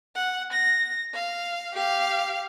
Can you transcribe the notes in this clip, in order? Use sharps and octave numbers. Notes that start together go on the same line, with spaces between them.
F#5
A#6
F5
G4 F5